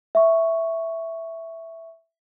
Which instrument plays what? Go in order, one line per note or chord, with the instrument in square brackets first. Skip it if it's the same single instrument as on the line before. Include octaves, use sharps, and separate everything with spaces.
[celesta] E5 C#6